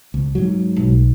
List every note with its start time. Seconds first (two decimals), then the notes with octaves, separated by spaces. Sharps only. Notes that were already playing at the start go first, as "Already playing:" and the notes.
0.14 C#2
0.35 G#2 F#3
0.77 B1